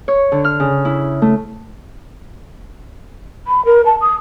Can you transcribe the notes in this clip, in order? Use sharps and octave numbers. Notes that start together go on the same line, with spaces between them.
C#5
D3
F6
C#3
E4
A3
B5
A#4
A5
D#6